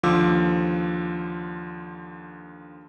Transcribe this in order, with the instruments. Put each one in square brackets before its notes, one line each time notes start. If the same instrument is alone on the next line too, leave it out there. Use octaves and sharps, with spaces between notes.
[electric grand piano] D#2 D3 F3 F4 D6 E6